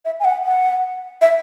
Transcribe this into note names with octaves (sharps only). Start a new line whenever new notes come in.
E5
G#5
F#5
F#5
E5